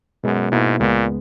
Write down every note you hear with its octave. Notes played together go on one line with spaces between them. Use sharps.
F#2 B2 G#3 B3
G#2 B2 A#3 E4
C#2 A#2 C#3 G#3 B3